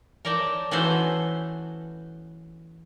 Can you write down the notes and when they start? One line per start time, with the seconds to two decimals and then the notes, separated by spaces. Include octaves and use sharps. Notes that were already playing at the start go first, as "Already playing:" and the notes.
0.25 A#4 C#5 D5 G5 A5
0.71 E3 A3 B3 C#4 F#4 C5